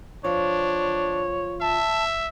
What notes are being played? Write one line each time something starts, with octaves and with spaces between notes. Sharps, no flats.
F3 D4 C#5
E5 A5